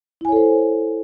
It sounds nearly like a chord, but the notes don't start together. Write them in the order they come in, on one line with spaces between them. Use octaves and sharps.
E4 G#5 C#5 A4 C5